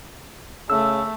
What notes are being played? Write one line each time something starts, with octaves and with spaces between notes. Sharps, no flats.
C#3 A3 E6